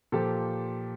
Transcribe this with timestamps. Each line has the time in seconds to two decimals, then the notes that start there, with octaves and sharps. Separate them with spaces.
0.12 A#2 F3 G4 A4